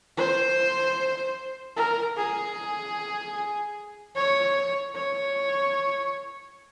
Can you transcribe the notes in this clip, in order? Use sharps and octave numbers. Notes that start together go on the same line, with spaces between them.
C5
A#4
G#4
C#5
C#5